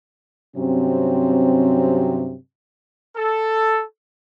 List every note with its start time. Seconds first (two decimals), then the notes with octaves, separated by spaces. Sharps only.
0.57 G2 C3 F#3 C4 C#4
3.16 A4